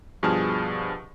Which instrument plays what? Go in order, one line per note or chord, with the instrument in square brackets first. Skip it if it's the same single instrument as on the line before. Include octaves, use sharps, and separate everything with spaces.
[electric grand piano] G2 B2 F3 G#4 A5 F6